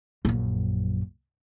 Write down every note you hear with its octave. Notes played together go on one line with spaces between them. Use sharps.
A#1 F#2